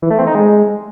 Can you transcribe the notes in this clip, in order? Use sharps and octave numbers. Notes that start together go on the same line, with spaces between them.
E3
A3
C4
D#4
G#3